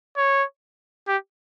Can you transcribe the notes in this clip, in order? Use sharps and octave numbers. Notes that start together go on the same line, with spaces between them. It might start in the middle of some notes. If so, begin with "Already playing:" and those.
C#5
G4